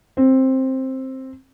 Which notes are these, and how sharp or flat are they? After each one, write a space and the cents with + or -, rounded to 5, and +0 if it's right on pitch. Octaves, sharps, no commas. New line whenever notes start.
C4 +10